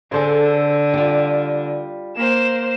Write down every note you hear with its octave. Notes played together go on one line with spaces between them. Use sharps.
D3 G#4 A4 C5
G3 F4
A#3 C5 E7